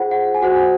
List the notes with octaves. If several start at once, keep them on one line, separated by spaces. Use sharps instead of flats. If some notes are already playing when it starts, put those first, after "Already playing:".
Already playing: F4 G#4 C5 F#5
F#5
G#5
F#4 C5 F#5